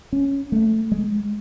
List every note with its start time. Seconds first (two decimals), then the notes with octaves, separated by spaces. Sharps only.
0.13 C#4
0.52 A3
0.92 G#3